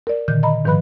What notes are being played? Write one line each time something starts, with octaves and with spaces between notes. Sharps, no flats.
A#4 D5
A#2 D3 D#3 G6
D#5 A#5 B5
G#2 D#3 F3 B4 B5 F#6